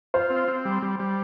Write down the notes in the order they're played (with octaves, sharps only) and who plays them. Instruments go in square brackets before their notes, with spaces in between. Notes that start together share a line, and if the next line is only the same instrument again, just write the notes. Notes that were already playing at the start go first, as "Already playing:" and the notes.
[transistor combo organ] F4 [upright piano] C5
[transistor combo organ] C4
C4
G3
G3
G3